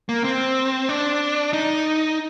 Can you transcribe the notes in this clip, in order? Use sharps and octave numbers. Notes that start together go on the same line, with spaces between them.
A#3
C4
D4
D#4